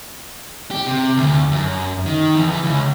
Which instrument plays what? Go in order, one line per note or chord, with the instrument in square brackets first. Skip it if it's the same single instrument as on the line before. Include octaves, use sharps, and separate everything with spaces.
[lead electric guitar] G4
C3
D2
F#2
D#3
E2
E3
C#2